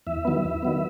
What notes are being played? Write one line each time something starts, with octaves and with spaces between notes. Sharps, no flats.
E2 E5
D#3 F#3 B3
E2
D#3 F#3 B3